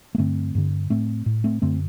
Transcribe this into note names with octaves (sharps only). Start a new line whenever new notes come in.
A#3
G2 D3 A3 C4
G2 D3
A2 A3 C4
A2
A3 C4
F#2 D3 A3 C4